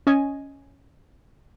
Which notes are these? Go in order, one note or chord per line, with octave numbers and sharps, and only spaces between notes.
C#4 D#5 G#5